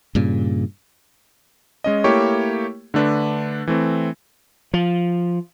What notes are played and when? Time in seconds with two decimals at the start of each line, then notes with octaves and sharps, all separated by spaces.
0.15 G2 A#2 C#3
1.84 G#3 C#4 D#5
2.04 A3 A#3 E4 G4 C#5 C#6
2.94 D3 A3 D4 B4
3.67 E3 A3 C4
4.74 F3